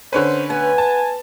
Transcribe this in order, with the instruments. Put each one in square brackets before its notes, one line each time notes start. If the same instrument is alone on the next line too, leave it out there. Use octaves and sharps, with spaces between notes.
[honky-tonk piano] D3 C#4 B4 [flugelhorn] C5
[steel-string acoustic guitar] B3 [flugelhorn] G#5
[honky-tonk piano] A5